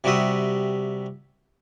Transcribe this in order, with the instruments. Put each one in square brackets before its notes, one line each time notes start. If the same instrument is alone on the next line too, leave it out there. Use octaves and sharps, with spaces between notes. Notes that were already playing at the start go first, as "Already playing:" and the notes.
[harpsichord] C3 G3 F#4 E5 D#6